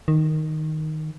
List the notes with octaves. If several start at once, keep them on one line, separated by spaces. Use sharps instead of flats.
D#3